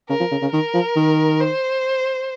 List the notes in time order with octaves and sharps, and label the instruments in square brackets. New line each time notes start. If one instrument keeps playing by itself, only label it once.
[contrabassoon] C#3 [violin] A#4
[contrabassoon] F3
C#3
C#3
[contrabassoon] D#3 [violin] A#4
[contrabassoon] F3
D#3
[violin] C5